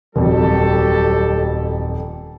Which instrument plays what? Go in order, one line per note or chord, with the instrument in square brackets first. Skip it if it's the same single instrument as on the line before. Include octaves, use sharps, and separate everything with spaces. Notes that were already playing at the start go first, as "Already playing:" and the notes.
[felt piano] D#1 F2 [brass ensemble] F#3 G4 A4